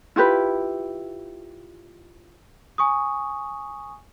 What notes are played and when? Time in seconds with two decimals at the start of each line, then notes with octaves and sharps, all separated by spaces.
0.16 E4 F4 G4 B4
2.78 G#5 C#6 D#6